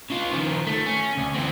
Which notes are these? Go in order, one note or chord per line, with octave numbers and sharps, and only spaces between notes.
C#3 F4
D#3 F3
A3
C#4
D2
E3 C4